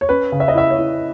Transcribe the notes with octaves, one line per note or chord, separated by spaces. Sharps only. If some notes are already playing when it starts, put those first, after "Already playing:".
C#5
C#4 B4
C#3
E5
D#5
E4 E5
C#5
E4